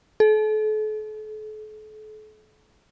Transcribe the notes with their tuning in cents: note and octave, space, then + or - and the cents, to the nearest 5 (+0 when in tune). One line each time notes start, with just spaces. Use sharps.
A4 -40